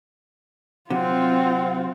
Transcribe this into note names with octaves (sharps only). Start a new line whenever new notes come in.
C3 F#3 C4 F4 F#5